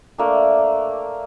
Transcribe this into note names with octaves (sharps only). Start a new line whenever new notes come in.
A3 A#3 D4